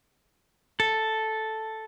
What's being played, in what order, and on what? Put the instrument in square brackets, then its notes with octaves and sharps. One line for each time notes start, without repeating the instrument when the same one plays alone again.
[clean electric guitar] A4